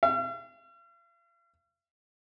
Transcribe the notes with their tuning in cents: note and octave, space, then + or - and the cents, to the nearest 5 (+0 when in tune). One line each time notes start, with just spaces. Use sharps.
F5 -45